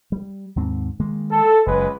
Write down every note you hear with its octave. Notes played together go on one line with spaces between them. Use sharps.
G3
D#2 G#2 C4
D#3 G#3 A#3
A4
F#1 C#2 G#3 B4